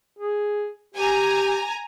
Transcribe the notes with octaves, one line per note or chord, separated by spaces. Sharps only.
G#4
G4 G#5 A#5